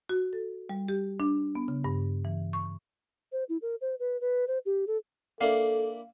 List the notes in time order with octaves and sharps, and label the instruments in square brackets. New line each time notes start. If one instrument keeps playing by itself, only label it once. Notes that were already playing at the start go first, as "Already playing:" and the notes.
[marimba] F#4
A4
G3
G4
D4
B3
C#3
G2
E3
C#6
[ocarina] C5
E4
A#4
C5
B4
B4
C5
G4
A4
[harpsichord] A#3 D4 E4 [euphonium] A4 [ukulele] F5